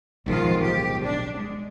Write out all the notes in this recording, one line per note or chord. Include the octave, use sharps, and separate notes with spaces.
D1 B1 G#2 D#3 F3 F4
G4
D4
G#3